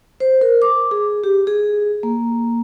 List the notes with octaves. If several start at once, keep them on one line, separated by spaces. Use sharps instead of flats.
C5
A#4
D6
G#4
G4
G#4
A#3